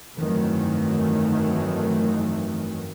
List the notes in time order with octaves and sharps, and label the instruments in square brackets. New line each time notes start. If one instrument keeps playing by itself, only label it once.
[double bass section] G1 F2 D#3 E3 F#3 A3